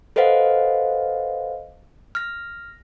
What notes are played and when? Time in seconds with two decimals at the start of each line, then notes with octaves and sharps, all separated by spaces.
0.16 A4 B4 C5 D#5 F5 F#5
2.15 F6 A#6